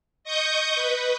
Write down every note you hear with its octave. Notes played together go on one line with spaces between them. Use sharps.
D#5 C#6 D#6 G6
B4